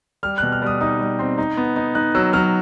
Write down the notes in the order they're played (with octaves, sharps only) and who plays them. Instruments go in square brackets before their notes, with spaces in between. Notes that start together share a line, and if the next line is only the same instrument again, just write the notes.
[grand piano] G3 F6
B2 F#6
F6
G3 D#6
D#4 D#6
G3
C4
D#4
B3
D#4
D#4 F#6
F#3 E6
F#3 F6